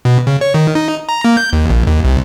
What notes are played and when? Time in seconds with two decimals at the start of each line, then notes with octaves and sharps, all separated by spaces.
0.05 B2
0.27 C#3
0.41 C#5
0.54 D#3
0.75 D#4
1.09 A#5
1.25 A#3
1.37 G6
1.53 D#2
1.70 A#1
1.87 D#2
2.04 C2